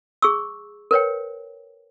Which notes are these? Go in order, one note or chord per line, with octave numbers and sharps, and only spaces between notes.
G#4 C#6 E6
A#4 B4 C#5 G5